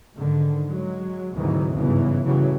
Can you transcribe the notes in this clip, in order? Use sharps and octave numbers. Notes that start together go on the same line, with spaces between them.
G#2 D3 D#3
F#3 G#3
D2 G#2 C3 D#3 E3 F#3
G1 E2 G#2 C#3 E3
A2 C#3 E3 F#3 G3